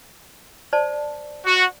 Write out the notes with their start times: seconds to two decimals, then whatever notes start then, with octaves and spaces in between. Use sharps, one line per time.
0.73 C5 D5 A5
1.46 F#4